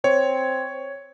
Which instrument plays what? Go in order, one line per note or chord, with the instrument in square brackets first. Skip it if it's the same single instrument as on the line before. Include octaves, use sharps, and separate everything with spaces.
[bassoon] C4 [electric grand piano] C#5